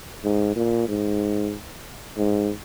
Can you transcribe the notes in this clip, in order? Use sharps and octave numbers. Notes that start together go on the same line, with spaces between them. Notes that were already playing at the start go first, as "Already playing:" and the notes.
G#2
A#2
G#2
G#2